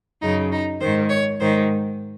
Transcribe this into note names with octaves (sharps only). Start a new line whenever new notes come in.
F#2 C#3 D#4
D#4
G#2 D#3 C5
C#5
G#2 D#3 C5